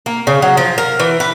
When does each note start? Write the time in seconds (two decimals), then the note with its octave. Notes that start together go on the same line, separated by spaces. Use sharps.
0.06 A#3
0.27 C#3
0.42 F#3
0.57 F3
0.78 A#4
1.00 E3
1.20 B4